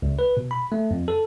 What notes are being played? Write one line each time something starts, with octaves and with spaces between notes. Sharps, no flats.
C#2
B4
B2
B5
A3
F2
A4